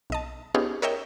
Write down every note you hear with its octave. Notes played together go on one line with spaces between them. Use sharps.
B1 D#5 A5
B3 C#4 D#4 F4 G4 G#4
A#4 C#5 D#5 E5 G5